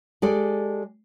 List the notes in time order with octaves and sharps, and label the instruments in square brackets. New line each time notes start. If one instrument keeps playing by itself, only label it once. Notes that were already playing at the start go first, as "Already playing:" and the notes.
[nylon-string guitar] G#3 G4 A4 D5